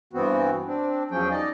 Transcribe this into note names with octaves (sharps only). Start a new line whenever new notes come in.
G2 E3 B3 C4 F#4
C4 D4
E2 F3 F#3 C#4 G#4 G5
D#4 D5 D#5